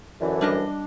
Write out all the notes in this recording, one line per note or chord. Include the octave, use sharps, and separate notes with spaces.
F#2 D3 E3
G3 D4 D#5